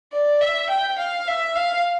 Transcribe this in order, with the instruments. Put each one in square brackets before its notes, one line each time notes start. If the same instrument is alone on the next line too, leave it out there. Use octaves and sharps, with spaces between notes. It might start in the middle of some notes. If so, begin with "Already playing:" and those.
[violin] D5
E5
G5
F5
E5
F5